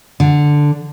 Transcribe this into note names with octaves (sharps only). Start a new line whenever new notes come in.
D3